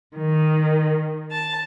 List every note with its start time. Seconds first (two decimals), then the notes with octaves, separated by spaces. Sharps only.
0.17 D#3
1.30 A5